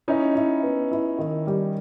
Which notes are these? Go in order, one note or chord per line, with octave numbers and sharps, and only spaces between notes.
C#4 D#4 E4
E4
B3
E4
D#3
G3